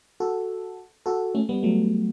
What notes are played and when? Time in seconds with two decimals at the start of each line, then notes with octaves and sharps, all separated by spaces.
0.20 F#4 A4
1.06 F#4 A4
1.35 A3 C#4
1.49 G3 B3
1.63 F#3 A3